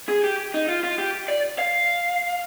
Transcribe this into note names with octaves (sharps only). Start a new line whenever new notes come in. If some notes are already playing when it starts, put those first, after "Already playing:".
G#4
G4
D#4
F4
F4
G4
D5
F5